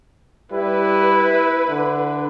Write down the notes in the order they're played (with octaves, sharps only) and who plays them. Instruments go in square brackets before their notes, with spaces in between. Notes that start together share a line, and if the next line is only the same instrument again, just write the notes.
[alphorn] G3 [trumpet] E4 [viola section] B4
[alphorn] D3